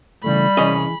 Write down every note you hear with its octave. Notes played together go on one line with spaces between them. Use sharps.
C#3 E3 G3 A3 B5
C2 E3 C#4 G#4 D#5